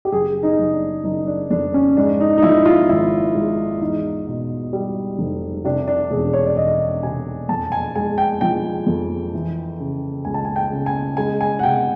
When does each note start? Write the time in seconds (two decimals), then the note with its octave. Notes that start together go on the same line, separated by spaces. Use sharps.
0.05 G4
0.12 F#1 G#4
0.43 D#4
0.59 F#1
0.73 D4
1.04 F#1 D#4
1.27 D4
1.50 F2 D4
1.74 C#4
1.97 G#2 D4
2.20 D#4
2.38 D#4
2.42 F3 E4
2.65 F4
2.89 G#1 E4
3.35 G#2
3.81 E2 D#4
4.26 B2
4.73 G3
5.19 F1
5.65 C3 D4
5.88 D4
6.10 E1 G#4
6.33 C#5
6.46 D5
6.57 E1 D#5
7.03 C3 G#5
7.49 F2 A5
7.72 G#5
7.95 G#3 G#5
8.18 G5
8.41 F3 G5
8.87 F2
9.34 E3
9.80 C#3
10.25 C#2 G#5
10.34 A5
10.45 G#5
10.56 G5
10.72 C#3
10.86 G#5
11.17 G#3 G#5
11.41 G#5
11.59 F#5
11.63 C3 G5